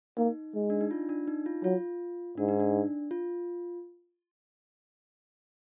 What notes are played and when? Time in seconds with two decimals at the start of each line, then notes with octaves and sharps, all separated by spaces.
0.18 A#3 D#4
0.55 G#3
0.70 D4
0.81 D#4
0.91 F4
1.09 D4
1.28 D#4
1.46 F4
1.64 F#3 F4
2.38 G#2 D4
2.48 D#4
2.60 D4
3.11 F4